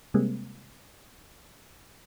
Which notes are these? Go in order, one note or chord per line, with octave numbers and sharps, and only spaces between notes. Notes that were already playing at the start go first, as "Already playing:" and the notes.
C3 G3 G#3 A#3 C4